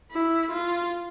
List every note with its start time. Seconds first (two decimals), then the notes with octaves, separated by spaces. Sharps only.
0.12 E4
0.51 F4